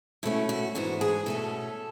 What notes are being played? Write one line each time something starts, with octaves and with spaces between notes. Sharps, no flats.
B2 A3 C#4 E4
F#4
G#2 E3 B3 D4 F#4
G#4
B2 A3 C#4 A4